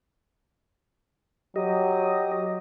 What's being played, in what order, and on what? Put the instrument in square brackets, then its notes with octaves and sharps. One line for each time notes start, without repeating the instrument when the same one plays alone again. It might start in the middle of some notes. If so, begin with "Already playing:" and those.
[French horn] F#3 [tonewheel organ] G4 D#5